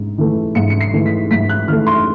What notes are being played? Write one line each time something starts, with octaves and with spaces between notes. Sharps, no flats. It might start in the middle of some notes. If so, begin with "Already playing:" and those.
Already playing: G#2
E3 A3
G#2 C#7
C#7
C7
E3 A3
B6
G#2 B6
F#6
E3 A3 F6
C6